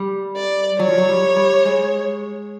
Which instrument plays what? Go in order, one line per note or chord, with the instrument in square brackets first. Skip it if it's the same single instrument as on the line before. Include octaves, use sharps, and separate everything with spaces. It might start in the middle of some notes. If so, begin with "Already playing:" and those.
Already playing: [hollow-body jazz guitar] G3
[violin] D5
[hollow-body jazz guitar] F#3 [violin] C#5
[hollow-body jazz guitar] F3
F#3
G3
G3
G#3